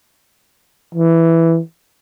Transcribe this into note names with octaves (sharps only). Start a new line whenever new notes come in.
E3